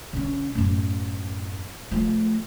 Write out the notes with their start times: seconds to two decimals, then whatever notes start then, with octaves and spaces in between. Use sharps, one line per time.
0.13 D3 C#4
0.55 F#2 A2
1.91 F3 A3